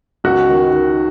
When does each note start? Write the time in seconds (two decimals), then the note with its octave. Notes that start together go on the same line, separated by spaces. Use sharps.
0.24 C#2 F#4
0.48 D#3
0.72 D#3